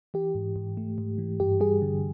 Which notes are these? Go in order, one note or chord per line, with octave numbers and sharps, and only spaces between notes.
E3 G4
G#2
G#2
A3
G#2
E3
G2 G4
G3 G#4
D3